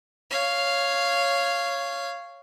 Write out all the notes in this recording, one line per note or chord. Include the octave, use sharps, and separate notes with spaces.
C#5 F5